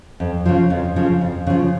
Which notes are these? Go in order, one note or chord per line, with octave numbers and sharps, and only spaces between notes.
F2
C#3 F3
F2
C#3 F3
F2
C#3 F3